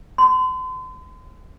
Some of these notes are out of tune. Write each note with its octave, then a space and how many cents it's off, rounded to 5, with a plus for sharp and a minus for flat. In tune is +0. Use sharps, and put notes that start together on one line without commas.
C6 -40